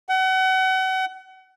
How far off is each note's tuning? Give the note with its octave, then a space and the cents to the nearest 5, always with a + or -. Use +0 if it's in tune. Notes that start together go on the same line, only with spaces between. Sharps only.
F#5 +35